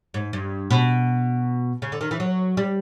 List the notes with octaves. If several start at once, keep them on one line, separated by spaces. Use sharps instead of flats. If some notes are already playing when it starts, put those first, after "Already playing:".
G#2
G2
B2
C#3
D3
D#3
E3
F#3
G3